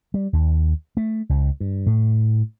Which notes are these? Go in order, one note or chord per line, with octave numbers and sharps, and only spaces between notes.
G3
D#2
A3
C#2
G2
A2